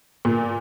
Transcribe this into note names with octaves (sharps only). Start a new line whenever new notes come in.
A#2